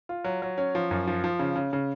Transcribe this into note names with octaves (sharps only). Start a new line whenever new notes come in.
F4
F#3
F#3
C#4
F3
F#2
F3
F3
C#3
C#3
C#3